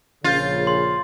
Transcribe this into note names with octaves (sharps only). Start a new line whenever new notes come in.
A#1 C#3 F4 G6 A6
C6